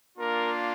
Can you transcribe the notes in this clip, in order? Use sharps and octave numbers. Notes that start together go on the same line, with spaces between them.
A#3 D4 F4 A#4